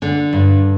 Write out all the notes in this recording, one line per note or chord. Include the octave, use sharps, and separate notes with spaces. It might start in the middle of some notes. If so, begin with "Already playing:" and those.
D3 D4
G2